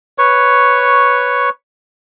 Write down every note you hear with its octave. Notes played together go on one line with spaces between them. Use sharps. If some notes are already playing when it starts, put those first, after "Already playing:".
B4 C#5 C#6